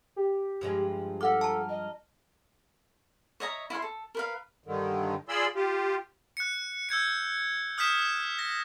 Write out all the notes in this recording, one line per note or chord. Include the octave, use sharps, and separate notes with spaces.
G4
G2 F3 G#3
A4 F5 F#5 D6 F6
A5 A#5
D#5
C#5 D#5 E5 A#5
E4 C#5 F5 C6
A4
A#4 B4 F5
G2 D3 D#3
F4 G#4 D5 B5 C6 E6
F4 G4
F#6 C#7
E6 G6 G#6 C#7
D#6 F6 G6 B6 E7
A#6